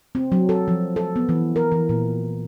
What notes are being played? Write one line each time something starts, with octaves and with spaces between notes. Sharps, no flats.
C4
F#3
A4
F3
A4
B3
E3
A#4
E3
A#2